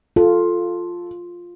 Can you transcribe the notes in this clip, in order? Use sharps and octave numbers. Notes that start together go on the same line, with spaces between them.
F4 A4